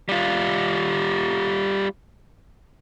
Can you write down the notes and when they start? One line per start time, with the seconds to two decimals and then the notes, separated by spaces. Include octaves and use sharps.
0.09 G3 F4